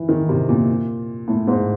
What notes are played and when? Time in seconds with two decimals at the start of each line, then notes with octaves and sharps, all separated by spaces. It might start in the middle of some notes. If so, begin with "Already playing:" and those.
Already playing: E3
0.09 D#3
0.29 C3
0.49 A#2
1.28 A2
1.48 G#2